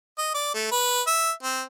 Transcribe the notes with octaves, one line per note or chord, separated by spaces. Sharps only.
D#5
D5
A3
B4
E5
C4